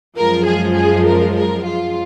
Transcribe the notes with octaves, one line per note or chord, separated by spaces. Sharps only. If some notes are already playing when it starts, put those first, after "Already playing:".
F#2 F3 G#3 A#4
G#4
G#4
A#4
A#4
F4